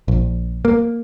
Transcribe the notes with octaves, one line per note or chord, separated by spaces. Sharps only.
A#1
A#3